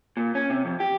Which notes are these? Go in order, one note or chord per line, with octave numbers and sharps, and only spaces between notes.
A#2
C#4
C3
F2
G4